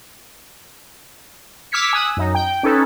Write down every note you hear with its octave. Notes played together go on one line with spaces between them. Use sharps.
D6 E6 F6 G#6 B6 C#7
G#5 D#6 E6 F#6
F#2 D#4
G5
C#4 D#4 A4 B4